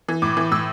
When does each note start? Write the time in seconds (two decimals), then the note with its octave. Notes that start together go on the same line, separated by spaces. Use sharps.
0.09 E3
0.22 A2 D6
0.37 E3
0.51 A2 E6